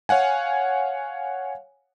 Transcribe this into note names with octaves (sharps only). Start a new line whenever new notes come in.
C#5 F5 F#5 G#5